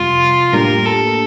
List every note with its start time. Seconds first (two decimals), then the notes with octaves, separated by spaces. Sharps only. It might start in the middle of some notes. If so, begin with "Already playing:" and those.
Already playing: F2 C3 G3 F4
0.52 A2 G3 A#3 D4 G4 A#4
0.86 A4